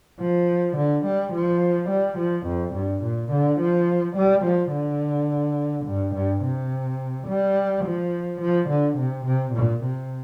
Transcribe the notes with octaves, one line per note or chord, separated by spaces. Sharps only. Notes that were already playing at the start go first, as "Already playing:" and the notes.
F3
D3
G3
F3
G3
F3
F2
G2
A#2
D3
F3
G3
F3
D3
G2
G2
C3
G3
F3
F3
D3
C3
C3
A#2
C3